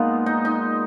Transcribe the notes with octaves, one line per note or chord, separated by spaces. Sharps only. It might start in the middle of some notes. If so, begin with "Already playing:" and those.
Already playing: A#2 G#3 B3 D#4 F4
D#4
D#4